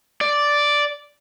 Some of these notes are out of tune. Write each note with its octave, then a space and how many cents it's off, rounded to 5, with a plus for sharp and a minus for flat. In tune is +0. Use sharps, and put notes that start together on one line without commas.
D5 -5